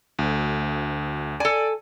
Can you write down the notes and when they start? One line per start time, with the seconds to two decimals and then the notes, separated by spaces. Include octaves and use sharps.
0.19 D2
1.40 A4 D5 G#5